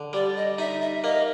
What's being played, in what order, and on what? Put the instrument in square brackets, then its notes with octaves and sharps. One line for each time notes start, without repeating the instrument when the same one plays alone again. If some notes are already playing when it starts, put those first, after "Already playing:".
Already playing: [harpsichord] D3
[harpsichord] G3 [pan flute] D5
[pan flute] D#5
[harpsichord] D#4 [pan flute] E5
[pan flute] E5
[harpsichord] A#3 [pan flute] D#5